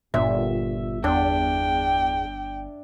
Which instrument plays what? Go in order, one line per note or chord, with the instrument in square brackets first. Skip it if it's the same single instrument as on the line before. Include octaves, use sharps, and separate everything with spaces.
[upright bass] G1 [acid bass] A#2 [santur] E5
[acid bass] E2 [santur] D4 [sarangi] G5